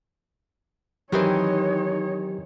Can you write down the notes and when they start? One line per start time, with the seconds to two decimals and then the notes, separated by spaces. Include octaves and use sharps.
1.12 D#3 E3 F#3 C4 D#4 G4 C#5